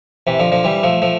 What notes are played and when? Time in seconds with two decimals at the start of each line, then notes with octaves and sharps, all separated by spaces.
0.27 C3 E3
0.39 D3 F3
0.52 D3 F3
0.64 E3 G3
0.83 F3 A3
1.02 F3 A3